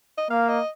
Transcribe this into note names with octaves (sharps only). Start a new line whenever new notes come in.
D#5
A#3 F5
D#5